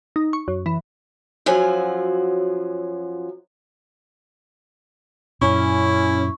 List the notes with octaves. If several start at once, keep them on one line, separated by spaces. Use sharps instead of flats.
D#4
C#6
F#2
E3
F#2 F3 F#3 G#5
F#2 A#2 C#4 E4 C#6